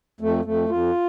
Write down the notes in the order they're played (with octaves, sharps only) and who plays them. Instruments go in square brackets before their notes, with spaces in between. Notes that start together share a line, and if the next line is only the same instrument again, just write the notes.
[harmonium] F2 A3
F2 A3
F2 F4